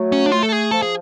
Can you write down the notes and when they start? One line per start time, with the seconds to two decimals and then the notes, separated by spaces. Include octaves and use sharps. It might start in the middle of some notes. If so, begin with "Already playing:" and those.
Already playing: F#3 A3
0.12 C#4
0.26 D4
0.32 A3 F4
0.43 A4
0.52 G#4
0.71 F3 A4
0.82 G#4